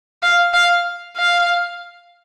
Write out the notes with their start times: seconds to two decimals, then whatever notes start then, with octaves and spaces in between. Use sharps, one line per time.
0.22 F5
0.53 F5
1.17 F5